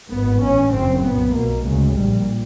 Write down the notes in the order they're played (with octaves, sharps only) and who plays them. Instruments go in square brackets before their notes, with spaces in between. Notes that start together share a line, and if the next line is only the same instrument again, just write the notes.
[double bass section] G#1 G#2 B3
A1 A2 C#4
F#1 F#2 C#3 C4
B1 A#2 B3
B1 B2 A#3
D2 C#3 G#3
A#1 A#2 G3